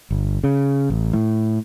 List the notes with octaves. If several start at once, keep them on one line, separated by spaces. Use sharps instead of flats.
G1
C#3
A1
A2